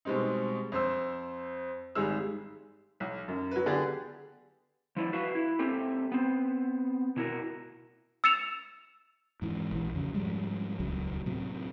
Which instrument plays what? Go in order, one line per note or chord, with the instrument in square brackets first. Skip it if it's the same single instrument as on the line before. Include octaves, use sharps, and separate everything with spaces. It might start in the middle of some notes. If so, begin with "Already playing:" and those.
[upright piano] B2 G3 G#3 C4 D#4
F2 C5 E6
G#1 D#3 G3 G#3 G#4 E6
B1
F#2
F#3 B4
D3 B3 G4 G#4 D5
[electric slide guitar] F3 E4 D5
F#4 B4 E5 F5
E4
A#3 C4 G4 A4 E5
B3 C4
B2 E4 F#4 A#4
[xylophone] E6 A6 C#7 E7 F7
[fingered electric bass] G#2 E3
A#1 E3
F2 C#3
G#2 F3 G3 G#3
D#1 C#2 F#3
A2 C3 F#3